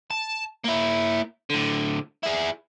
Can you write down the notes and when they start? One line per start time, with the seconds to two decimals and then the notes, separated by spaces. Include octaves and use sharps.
0.11 A5
0.64 A#3 E4
1.50 A2 D3
2.23 E4 G#4